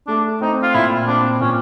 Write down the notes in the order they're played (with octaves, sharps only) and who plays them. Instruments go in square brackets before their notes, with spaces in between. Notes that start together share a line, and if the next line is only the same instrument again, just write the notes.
[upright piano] A3 [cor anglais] D4
[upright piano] C4 [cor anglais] D#4
[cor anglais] F4
[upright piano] A#2 [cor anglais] E4
[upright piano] C4 [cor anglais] D4
[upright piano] A#2 [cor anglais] C#4